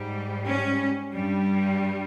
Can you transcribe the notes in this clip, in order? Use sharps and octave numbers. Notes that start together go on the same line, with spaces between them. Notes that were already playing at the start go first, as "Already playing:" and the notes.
Already playing: G#2 G3
C#4
G2 G3